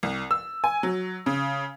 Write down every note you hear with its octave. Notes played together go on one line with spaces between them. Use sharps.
C2
E6
G#5
F#3
C#3